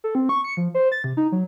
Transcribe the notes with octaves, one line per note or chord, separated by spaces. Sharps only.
A4
C4
C#6
C#7
F3
C5
A6
C3
D#4
F#3